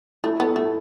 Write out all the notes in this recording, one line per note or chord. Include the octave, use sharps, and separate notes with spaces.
A3 E4
B3 A4
A3 E4